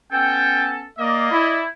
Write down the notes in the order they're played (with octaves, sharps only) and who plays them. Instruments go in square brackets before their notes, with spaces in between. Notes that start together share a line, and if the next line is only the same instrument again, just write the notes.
[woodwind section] B3 C#4 A4 [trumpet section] G5
[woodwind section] A#3 [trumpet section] D5 D#5
[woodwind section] E4